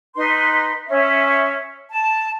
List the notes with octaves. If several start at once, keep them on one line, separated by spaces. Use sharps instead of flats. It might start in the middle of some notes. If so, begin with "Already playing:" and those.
D#4 B4 C6
C#4 E5
A5